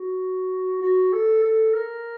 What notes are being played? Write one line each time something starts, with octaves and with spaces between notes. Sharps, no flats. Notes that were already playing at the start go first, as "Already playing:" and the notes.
Already playing: F#4
F#4
A4
A4
A#4